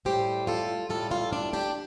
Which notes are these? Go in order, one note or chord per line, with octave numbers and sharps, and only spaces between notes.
A2 G3 G4 C5
F4 A4
A2 G3 F4 A4
F4 A4
D4
D4 G4